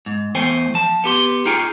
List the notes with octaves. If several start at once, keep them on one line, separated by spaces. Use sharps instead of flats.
G#2
E2 A3 C5 G5 G#5
F3 A5
B3 G4 C6
D#4 F4 G#4 G5 G#5